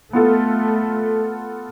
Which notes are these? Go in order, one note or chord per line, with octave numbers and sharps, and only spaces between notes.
A3 B3 F4 A4